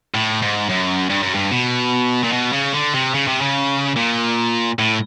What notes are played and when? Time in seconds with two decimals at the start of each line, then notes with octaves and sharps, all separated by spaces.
0.14 A2
0.42 G#2
0.69 F#2
1.09 G2
1.23 F#2
1.35 G2
1.51 B2
2.24 A#2
2.33 B2
2.53 C#3
2.74 D3
2.94 C3
3.14 C#3
3.27 C3
3.41 C#3
3.96 A#2
4.79 A2